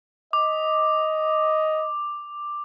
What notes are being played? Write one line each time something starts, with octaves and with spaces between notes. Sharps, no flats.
D#5 D6